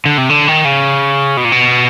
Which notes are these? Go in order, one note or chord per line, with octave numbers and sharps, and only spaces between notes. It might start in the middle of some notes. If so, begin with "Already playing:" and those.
D3
C3
D3
D#3
C#3
B2
A#2
B2